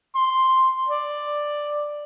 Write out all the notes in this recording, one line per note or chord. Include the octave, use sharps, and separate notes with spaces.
C6
D5